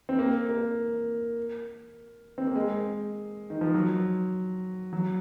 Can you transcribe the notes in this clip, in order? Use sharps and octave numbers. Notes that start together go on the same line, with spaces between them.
C4
A#3
A#3
C4
A#3
G#3
D#3
F3
F#3
F#3